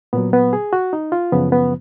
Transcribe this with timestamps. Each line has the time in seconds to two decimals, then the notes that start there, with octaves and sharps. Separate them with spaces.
0.13 A#2 F#3 B3
0.33 B3
0.53 G#4
0.73 F#4
0.93 D#4
1.12 F4
1.32 F#2 C#3 F3 B3
1.52 B3